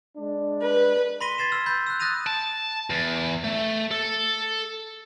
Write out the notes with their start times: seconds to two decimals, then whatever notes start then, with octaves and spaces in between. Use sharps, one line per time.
0.15 G#3 D4
0.63 B4
1.21 B5 C6 A#6 B6 D#7 G7
1.38 B5 G#6 A6 C7 E7
1.52 E6 F6
1.66 B5 G6 A6
1.87 E6 F#6
2.00 D#6 F#6 A6 A#6 D#7 F7
2.27 A5
2.90 E2
3.44 A3
3.91 A4